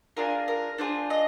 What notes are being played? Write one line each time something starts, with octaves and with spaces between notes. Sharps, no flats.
D4 F4 G#4 A#4
A#4
D4 F4 G#4 C5
D#5